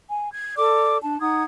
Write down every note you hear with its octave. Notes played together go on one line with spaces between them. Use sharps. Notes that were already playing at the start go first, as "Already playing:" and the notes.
G#5
G#6
A4 D5 D6
D4 A5
D#4 F#5 D#6 G#6